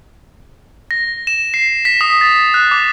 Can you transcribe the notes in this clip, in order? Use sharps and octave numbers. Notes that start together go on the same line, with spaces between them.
A#6
E7
C7
B6
D#6
A6
F#6
D6